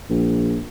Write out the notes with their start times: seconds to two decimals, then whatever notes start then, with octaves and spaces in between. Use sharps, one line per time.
0.09 A#1